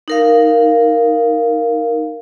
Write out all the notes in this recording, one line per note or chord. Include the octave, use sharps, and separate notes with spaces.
D#4 A#4 F5